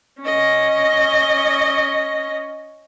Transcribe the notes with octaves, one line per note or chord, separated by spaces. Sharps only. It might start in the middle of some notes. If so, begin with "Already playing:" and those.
C#4 D#5